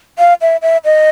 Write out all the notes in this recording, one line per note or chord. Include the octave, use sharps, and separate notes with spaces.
F5
E5
E5
D#5